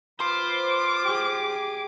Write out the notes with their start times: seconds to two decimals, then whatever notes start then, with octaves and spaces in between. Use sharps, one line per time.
0.20 F4 B4 C5 D6
1.03 G4 G#4